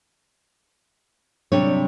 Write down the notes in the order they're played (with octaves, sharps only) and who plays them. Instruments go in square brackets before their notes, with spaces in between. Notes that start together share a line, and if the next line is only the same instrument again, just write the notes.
[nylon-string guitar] C3 G3 C#5 [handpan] F#3 D4